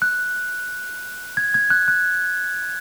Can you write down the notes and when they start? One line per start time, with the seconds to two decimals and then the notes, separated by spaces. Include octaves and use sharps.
0.02 F#6
1.37 G#6
1.54 G#6
1.70 F#6
1.88 F#6